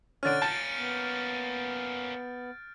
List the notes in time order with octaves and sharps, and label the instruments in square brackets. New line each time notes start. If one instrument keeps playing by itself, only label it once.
[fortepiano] D3 C#4 [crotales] F6 A6 D7
[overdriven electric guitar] A#3 C#4 [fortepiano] A5 [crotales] G6 A6
[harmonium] B3